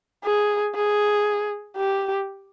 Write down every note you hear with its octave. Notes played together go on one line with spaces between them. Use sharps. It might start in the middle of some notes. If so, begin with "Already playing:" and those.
G#4
G#4
G4